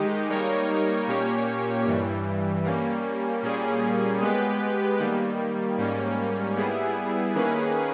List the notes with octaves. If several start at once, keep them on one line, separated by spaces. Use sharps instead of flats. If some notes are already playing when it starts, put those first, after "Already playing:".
Already playing: D#3 G#3 D#4 G4
G3 A#3 D#4 A#4 C#5
A#2 A#3 C#4 G4 C#5
G2 E3 G3
G3 A#3 C#4
A#2 G3 A#3 C#4 G#4
G#3 B3 G4 B4
D#3 G3 A#3
G#2 G3 A#3 C#4
G3 B3 E4 G#4
D#3 A#3 C#4 G#4 B4